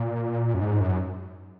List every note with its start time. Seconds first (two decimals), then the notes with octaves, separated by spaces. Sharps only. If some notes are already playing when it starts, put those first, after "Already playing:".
Already playing: A#2
0.54 F#2
0.61 G#2
0.81 F#2